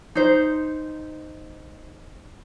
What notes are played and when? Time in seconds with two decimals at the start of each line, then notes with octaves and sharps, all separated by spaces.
0.15 D#4 C5